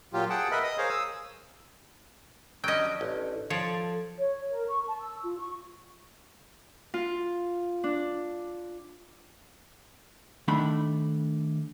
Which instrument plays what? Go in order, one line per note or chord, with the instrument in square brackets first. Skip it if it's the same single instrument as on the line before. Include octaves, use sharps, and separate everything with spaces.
[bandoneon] A#2 F#3 F4 G4
G#4 F#5 G5 A5
A#4 B4 D#5 E5 B5
D#5 D#6
G#4 A#4 C5 C#5 F5
D#6 E6
[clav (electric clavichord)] F#3 G3 C#4 [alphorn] D4 [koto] D#5 G5
[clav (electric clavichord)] A1
[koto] F3 [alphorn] A4 [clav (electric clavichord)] C#5 D5
[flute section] C#5
A#4
C#6
A5
E6
F4
C#6
[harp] F4
D4
[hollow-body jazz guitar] D#3 A3 D4 B5